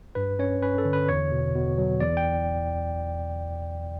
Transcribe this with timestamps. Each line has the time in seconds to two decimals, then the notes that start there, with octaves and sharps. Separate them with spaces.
0.15 G2 B4
0.39 C#4 C#5
0.62 C#4 B4
0.78 A4
0.85 D3
0.93 B4
1.09 E2 C#5
1.32 B2
1.55 B2
1.78 F#3
2.00 E2 D5
2.17 G5